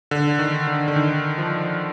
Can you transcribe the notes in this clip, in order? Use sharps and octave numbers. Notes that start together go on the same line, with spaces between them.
D3
D#3
D3
D3
D#3
F3